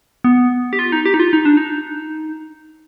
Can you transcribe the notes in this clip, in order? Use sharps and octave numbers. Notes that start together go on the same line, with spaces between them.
B3
G4
F4
D#4
G4
D#4
F4
D#4
D4
D#4